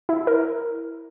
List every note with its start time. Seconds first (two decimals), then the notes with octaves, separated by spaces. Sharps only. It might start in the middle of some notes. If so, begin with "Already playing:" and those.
0.09 E4
0.27 A#4